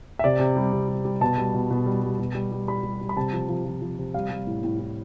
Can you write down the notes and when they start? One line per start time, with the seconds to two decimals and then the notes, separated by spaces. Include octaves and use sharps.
0.19 E5
0.24 C3 D5
0.40 C3
0.57 G3
0.73 C3
0.89 G3
1.05 G3
1.21 B2 A5
1.38 G3
1.54 B2
1.70 B2
1.86 G3
2.02 G3
2.19 B2
2.35 G3
2.52 G3
2.68 G3 B5
2.84 G3
3.01 G3
3.09 B5
3.16 C3 A5
3.33 F3
3.49 F3
3.65 F3
3.82 F3
3.99 C3
4.14 G3 F5
4.30 G3
4.47 A2
4.64 A2
4.79 A2